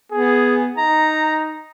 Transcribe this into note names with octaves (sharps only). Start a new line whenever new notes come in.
B3 G#4
D#4 A#5